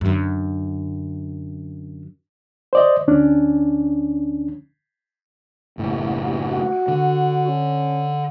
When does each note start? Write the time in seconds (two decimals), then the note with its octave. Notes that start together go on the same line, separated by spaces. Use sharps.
0.01 F#2 D3
2.73 C5 D5 D#5
3.07 D2 C#4 D4
5.78 F#1 A2
6.37 F#4
6.88 D3
7.48 C#4